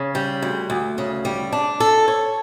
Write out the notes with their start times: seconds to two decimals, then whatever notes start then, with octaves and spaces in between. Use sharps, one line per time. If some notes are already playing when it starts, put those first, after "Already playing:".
Already playing: C#3
0.15 G3
0.43 D2
0.70 D2
0.98 C#3
1.25 G3
1.53 D4
1.80 A4
2.08 C#5